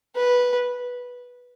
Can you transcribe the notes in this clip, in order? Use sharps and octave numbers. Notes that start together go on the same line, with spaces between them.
B4